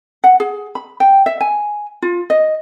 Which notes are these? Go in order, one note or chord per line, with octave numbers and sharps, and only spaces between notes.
F#5
G#4
B5
G5
E5
G#5
F4
D#5